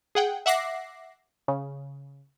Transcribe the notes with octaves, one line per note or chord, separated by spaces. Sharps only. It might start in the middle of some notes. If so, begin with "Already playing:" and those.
G#4 F#5 G5
E5 F#5 D6 A#6 C7
C#3